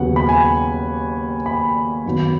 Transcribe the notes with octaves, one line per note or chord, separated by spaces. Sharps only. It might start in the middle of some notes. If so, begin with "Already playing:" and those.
Already playing: D#2 C#3 F#3 B3 F#5
B5
G#5
B5
F#2 D#3 F#3 B3